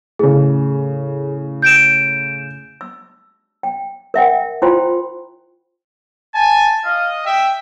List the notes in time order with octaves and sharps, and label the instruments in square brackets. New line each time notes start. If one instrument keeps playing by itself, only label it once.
[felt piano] A2 C#3 [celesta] G#4
[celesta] G6 D7 E7
[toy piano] E6
G5
A#4 E5 F#5 G5
E4 F4 C5 G5 G#5 C6
[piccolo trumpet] G#5 [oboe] A5
[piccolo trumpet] D#5 [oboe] F5
[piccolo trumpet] E5 [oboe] G5